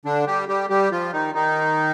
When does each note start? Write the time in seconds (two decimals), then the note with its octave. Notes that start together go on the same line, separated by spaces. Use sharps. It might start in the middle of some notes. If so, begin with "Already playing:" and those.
0.05 D3 D4
0.27 G3 G4
0.48 G3 G4
0.70 G3 G4
0.92 F3 F4
1.13 D#3 D#4
1.34 D#3 D#4